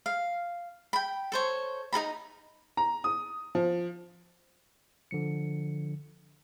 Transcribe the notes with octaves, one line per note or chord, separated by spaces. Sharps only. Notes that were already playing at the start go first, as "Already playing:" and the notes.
F5
G5 B5
A4 C5 C#5
D#4 A4 A#5 B5
A#5
D#6
F3
D3 F3 C#7